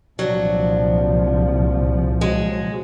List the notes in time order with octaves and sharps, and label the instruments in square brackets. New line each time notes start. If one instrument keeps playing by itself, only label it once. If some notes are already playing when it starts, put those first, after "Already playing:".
[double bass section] C2 A#2 F3 [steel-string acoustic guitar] F#3 D4
[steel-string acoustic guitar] F#3 G#3